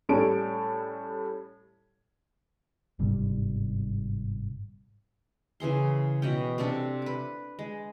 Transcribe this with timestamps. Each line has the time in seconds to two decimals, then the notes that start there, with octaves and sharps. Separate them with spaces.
0.09 A2 G3 C#4 A4 D7
2.99 G1 G#2 C3 G3
5.60 C#3 E3 G#4 C6
6.22 B2 E3 C#4 G5
6.58 C3 C4 D4 A4
7.02 B4 D6
7.59 G#3